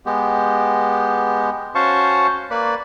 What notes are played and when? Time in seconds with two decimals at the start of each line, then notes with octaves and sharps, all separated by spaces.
0.06 G#3 B3 G4
1.75 C#4 F#4 C5 F5 A5 C#6
2.51 A#3 B4 D5 B5